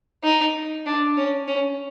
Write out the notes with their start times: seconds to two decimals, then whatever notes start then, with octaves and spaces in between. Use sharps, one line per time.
0.24 D#4
0.86 D4
1.17 C#4
1.48 C#4